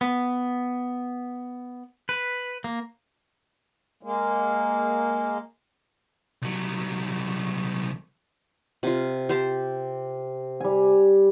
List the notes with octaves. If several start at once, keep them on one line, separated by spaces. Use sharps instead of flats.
B3
B4
A#3
G#3 A#3
C2 F#3
C3 F4
G4 C5 A5
G3 G#5